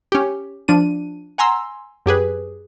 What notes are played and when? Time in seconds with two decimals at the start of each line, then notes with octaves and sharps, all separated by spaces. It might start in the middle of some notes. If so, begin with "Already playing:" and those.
0.12 C#4 G4
0.68 F3 D4 D#7
1.38 F#5 G#5 A#5 C6 E6
2.06 F#2 G4 G#4 B4